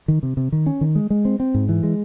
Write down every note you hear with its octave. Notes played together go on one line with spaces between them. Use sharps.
D#3
C3
C3
D#3
C#4
D#3
G#3
G#3
C4
C4
G#2
E3
G#3